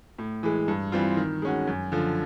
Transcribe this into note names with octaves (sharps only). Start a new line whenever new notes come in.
A2
E3 G#3
G2
E3 G3 C4 F4
D#3
G#3 C#4 F#4
F#2
D3 F3